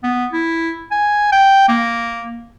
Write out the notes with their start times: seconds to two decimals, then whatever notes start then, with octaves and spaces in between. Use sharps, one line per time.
0.03 B3
0.32 E4
0.91 G#5
1.32 G5
1.68 A#3